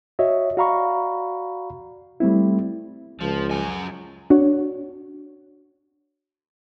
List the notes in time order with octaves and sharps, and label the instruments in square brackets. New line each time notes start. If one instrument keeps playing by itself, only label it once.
[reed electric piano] F#4 C#5 D#5 E5
F#4 D5 F5 A#5 B5 C#6
G3 A3 C4 E4
[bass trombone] C#2 [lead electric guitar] F3
[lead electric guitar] F#2 G#5
[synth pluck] D4 F#4 C#5